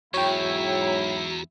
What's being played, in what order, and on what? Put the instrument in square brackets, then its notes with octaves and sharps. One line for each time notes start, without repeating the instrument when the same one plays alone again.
[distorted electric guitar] E2 [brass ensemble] G#2 F#3 E4 [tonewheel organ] F#4 A#5 [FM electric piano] C#5 G5